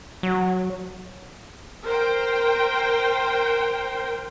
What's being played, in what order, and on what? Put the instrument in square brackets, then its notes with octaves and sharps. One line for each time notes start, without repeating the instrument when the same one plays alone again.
[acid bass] F#3
[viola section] A#4 C5 G5